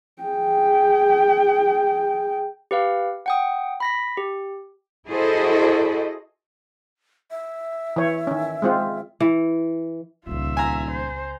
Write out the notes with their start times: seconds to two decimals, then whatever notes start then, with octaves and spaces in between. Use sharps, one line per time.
0.22 G#4 G5
2.71 G4 B4 F5
3.26 F#5 G5 D#6
3.80 B5 A#6 B6
4.17 G4
5.09 E4 F#4 G#4 A4 C5 D#5
7.31 E5
7.96 E3 C#5
8.27 D#3 C#4
8.62 G#3 C4 F4
9.20 E3
10.27 D#1 C#2 B3 F4 E5
10.57 G#5 A#5
10.91 C5